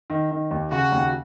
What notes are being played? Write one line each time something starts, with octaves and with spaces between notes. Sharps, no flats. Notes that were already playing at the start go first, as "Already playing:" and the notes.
D#3
D#3
D#2
C#3 F#4
D#2